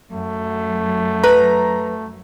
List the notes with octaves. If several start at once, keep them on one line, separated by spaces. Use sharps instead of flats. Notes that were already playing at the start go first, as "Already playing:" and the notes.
F#2 F#3 A3
B4 A#5